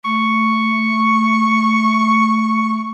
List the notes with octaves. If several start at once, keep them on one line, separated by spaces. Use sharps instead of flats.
A3 C#6